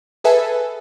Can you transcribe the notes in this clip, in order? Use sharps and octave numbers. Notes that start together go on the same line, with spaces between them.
G#4 A4 B4 E5 G#5 A5